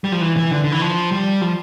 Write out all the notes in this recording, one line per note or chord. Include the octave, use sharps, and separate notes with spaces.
G3
F3
E3
E3
D3
D3
E3
F3
G3
F3